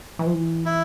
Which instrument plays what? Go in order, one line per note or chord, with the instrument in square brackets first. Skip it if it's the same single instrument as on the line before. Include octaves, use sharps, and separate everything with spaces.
[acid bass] E3
F3
E3
[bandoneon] E4